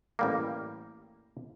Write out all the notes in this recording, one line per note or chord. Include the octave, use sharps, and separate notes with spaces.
A1 G3 A#3